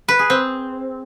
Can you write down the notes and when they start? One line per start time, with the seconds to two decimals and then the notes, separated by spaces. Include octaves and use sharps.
0.08 B4
0.19 G#4
0.30 C4